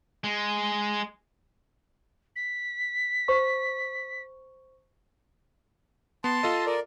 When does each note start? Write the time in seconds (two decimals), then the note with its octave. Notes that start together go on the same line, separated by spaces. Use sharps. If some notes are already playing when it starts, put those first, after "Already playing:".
0.24 G#3
2.36 B6
3.28 C5 C#6
6.24 B3 A5 C6
6.43 F4 A4 D#5
6.66 A#4 D5